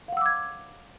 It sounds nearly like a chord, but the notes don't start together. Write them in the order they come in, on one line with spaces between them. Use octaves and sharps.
F5 F#5 E6 D6 G#6